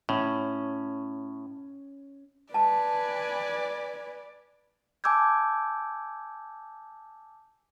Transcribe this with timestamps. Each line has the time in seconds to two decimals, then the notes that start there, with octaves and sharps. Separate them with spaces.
0.09 A2 C#4
2.54 B4 D5 G#5 A5
5.04 G#5 A5 D6 E6 G6 G#6